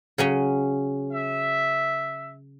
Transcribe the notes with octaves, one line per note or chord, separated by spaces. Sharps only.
C#3 F#3 C#4
E5